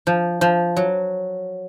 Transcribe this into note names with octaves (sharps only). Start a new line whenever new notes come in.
F3
F3
F#3